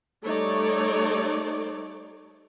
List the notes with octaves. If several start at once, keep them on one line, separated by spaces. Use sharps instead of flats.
G3 A3 D#4 A4 C#5 D5